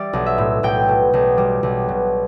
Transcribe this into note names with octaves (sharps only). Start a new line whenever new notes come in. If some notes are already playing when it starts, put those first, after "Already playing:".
Already playing: G3 D5 E5
B1
E5
A2
B1 G5
B2
B1
G3
B1
B2